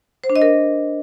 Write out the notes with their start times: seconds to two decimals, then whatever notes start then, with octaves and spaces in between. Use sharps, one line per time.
0.24 C5
0.30 D4
0.36 D#5
0.42 A#4